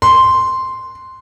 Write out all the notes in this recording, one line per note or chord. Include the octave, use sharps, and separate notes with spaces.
C6